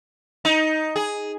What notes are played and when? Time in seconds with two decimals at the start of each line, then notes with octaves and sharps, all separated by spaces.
0.45 D#4
0.96 G#4